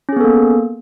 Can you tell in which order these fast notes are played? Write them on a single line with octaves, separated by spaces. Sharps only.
C#4 G#4 B3 A4 A#3